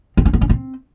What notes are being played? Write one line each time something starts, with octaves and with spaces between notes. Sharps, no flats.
C4
C#4
B3
C#4
C4